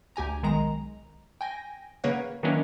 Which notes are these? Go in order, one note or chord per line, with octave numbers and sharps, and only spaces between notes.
D2 G4 G#5 A#5
B1 D#3 G#3 A#5
G5 G#5 A#6
C#3 A#3 B4 C#5 F#5
D#3 E3 F#3 A#3 C#4 D4